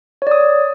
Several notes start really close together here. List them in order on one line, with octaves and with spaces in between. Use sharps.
C#5 D5 D#6